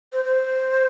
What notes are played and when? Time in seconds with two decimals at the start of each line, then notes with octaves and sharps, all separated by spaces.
0.13 C5
0.25 C5